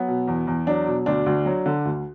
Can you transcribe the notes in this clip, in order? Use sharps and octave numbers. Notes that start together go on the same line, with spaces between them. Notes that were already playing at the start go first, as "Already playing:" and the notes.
Already playing: F#3 B3
B2
E2
E2
F#3 D4
B2
D2 D4
D2
F#3
D3
D2